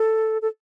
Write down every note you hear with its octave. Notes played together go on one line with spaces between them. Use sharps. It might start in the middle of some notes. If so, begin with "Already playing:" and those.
Already playing: A4
A4